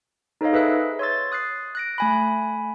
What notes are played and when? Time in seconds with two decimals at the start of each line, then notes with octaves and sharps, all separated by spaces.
0.41 D#4 A4 C5 C#5 D#5 F5
0.53 G#4 B4 E5 E6 F#6
0.99 C#5 C6 E6 A6
1.32 D#6 F#6 A6 C7
1.75 F#6 A#6 D7
1.98 A3 G#5 B5